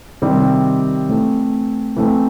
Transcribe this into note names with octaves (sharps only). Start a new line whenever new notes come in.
C3 D#3 G3 C4
E3 A3 C4
E3 A3 C4